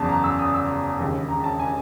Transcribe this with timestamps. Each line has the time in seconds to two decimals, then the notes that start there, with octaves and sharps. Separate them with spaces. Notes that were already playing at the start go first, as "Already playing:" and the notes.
Already playing: F#1 E2 C#3 A5
0.09 A#5
0.24 E6
0.39 D#6
0.54 E6
0.99 E1 D#2 C#3
1.29 A#5
1.44 A5
1.59 G#5